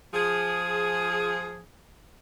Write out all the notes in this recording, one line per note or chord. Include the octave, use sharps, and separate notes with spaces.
F3 G#4